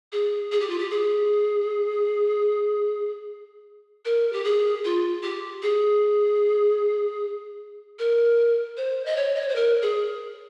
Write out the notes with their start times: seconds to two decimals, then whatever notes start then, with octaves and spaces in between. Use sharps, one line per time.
0.12 G#4
0.51 G#4
0.60 G4
0.69 F4
0.78 G4
0.90 G#4
4.05 A#4
4.32 G4
4.44 G#4
4.84 F4
5.22 G4
5.62 G#4
7.99 A#4
8.77 C5
9.05 D#5
9.16 C#5
9.35 D#5
9.41 C#5
9.49 C5
9.55 A#4
9.82 G#4